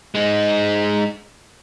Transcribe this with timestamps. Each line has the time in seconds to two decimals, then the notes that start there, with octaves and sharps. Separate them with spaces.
0.15 G#3 D#4